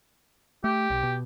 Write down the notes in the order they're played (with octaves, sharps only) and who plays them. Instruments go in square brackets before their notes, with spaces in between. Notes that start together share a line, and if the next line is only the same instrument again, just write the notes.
[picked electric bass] A3 [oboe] G4
[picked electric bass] B1
B2